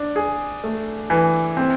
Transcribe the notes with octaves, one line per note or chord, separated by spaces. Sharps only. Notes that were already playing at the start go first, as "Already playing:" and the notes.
Already playing: D4
G#4
A3
E3
C4